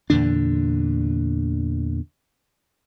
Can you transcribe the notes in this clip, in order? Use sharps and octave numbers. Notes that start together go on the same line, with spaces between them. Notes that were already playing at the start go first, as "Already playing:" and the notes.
E2 A#2 D3 D4